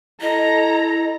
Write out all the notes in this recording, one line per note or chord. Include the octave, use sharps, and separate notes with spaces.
E4 A4 D#5 A#5